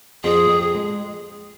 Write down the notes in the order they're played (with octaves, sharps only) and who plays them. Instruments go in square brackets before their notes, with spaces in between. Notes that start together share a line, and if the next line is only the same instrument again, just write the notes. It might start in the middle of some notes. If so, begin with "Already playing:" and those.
[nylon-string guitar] F2 [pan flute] G#4
[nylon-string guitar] F2
G#3